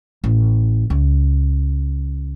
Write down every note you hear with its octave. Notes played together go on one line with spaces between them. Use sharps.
A1
C#2